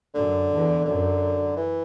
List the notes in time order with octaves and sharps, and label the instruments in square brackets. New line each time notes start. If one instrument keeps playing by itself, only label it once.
[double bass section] F#2 [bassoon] D3
[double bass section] E2
[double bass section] F#2 [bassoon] D3
[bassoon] E3